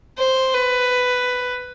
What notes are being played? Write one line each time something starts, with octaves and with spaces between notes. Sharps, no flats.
C5
B4